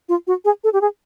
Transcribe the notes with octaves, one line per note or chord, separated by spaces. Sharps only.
F4
F#4
G#4
A4
G4
G#4